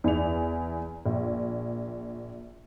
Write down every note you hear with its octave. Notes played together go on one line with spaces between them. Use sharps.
E2 D5 F7
A#1